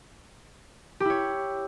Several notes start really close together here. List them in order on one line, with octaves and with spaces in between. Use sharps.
G4 E4 C#5